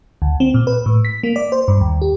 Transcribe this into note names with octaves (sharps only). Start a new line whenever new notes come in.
D2
C4
A#2
B4
A2
B6
A#3
D5
C5
G2
D#2
G4